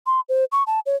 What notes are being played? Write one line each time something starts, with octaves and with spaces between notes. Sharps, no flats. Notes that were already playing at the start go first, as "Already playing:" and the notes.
C6
C5
C#6
A5
C#5